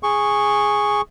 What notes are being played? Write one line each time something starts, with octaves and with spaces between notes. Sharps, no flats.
G#4 C#6